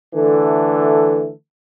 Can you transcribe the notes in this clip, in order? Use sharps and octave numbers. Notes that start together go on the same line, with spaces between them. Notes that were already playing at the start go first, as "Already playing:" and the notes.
D3 E3 A3 A4